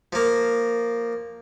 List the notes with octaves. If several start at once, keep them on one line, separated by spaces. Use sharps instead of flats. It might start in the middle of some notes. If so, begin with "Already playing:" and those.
F3 A#3